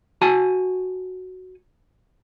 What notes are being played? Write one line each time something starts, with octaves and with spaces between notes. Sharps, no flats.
F#4 G#5 A5